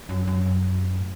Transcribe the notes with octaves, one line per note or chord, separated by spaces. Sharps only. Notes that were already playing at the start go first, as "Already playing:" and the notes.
F#2
F#2
A2